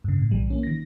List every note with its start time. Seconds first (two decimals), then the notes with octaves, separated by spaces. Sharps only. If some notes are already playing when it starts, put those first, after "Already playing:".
0.04 G2 C#3
0.18 A2
0.31 B1 E3 G3
0.50 A#3 C#4
0.63 D#3 A#6